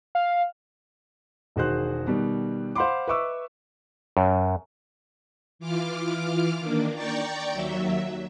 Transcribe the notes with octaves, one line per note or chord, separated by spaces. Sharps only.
F5
E1 D#3 F#4 G#4 C5 F#6
B2 D#3 G3
C5 F5 F#5 B5 C6 D6
B4 D#5 E5 C#6 D6 E6
F#2
E3 F4 D6 F6
D#3 A#3 D4
D5 G5 A#5 C#6 G6 A6
D#2 F#3 E5